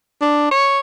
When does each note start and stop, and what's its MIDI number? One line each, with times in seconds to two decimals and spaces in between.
0.22 0.51 62
0.52 0.80 73